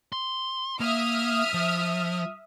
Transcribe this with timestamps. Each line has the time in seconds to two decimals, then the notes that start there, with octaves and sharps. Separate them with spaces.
0.13 C6
0.80 A#3 E5 D#6 F6
1.54 F3